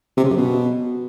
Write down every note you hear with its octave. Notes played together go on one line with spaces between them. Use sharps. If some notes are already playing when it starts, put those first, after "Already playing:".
C3
C#3
F#2
B2